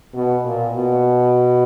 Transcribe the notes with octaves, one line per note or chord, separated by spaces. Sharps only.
B2
A#2
B2